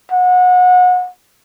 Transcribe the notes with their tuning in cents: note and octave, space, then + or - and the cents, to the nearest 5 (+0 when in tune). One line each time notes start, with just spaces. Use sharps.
F#5 -30